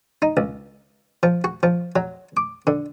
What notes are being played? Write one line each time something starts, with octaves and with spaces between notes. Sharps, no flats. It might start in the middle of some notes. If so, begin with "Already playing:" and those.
D#4
C#2
F3
F#4
F3
F#3
D6
D3